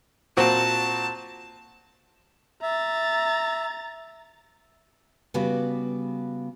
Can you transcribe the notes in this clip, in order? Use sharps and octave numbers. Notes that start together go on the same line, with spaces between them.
A#2 C4 F#4 A5
E5 A#5 A6
C#3 G3 B3 F#4 B4 D5